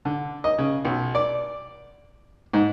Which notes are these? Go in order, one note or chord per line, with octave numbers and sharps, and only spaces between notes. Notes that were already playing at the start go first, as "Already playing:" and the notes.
D3
D#5
C#3
B1
D5
G#2